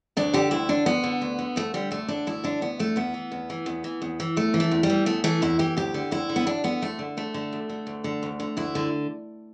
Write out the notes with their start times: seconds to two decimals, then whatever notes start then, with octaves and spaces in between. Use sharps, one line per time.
0.17 D2 D4
0.34 D3 G4
0.51 D2 E4
0.69 D3 D4
0.86 D2 B3
1.04 D3
1.21 D2
1.39 D3
1.56 D2 A3
1.74 D3 G3
1.91 D2 A3
2.08 D3 D4
2.27 D2 E4
2.44 D3 D4
2.61 D2 B3
2.79 D3 A3
2.96 E2 B3
3.14 E3
3.32 E2
3.50 E3
3.66 E2
3.84 E3
4.02 E2
4.20 E3
4.36 E2 A3
4.54 E3
4.60 A3
4.71 E2
4.83 G3
4.90 E3
5.06 E2 A3
5.24 E3 A3
5.42 E2 E4
5.59 E3 G4
5.77 D2 G4
5.94 D3
6.11 D2 E4
6.29 D3
6.36 B3
6.46 D2 D4
6.64 D3 B3
6.82 D2 A3
6.99 D3
7.17 D2 A3
7.34 D3
7.53 D2
7.69 D3
7.87 D2
8.04 D3
8.23 D2
8.40 D3
8.57 D2 E4
8.75 D3